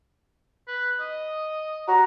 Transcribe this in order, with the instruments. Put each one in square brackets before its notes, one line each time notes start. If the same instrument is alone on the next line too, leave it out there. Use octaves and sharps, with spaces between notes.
[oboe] B4
D#5
[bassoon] F#4 [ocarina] A#5